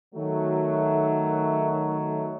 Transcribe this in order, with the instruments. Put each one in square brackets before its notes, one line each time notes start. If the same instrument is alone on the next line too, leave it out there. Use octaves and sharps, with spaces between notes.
[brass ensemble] D#3 F#3 A3